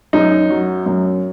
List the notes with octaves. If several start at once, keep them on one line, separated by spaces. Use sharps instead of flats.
F#2 D#4
F#3
F#2